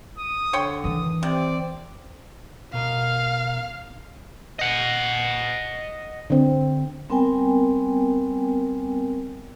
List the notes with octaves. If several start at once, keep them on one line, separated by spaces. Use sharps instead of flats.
D#6
D3 C#5 G5 C6
D#3 E3 D#6
C3 C4 D5
B2 A#4 D#5 F5
D#5 F#5
D3 C4
G3 B3 C4 A#4 G5 G#5